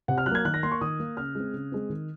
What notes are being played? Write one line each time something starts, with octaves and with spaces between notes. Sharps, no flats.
C3 F#5
F6
F#3 F#6
A#3 G#6
D#3 F#6
A#6
A#3 C6
C#6
D#3 D#6
A#3
C#3 F6
G#3 C4
C#3
G#3 C4
D#3